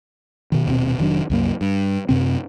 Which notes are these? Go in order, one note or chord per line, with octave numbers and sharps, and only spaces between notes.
B2 D#3
D#1 B2 C4
F1 D#3 F#3 D4
C2 F#2 A#3
G2
F#2 C3 C4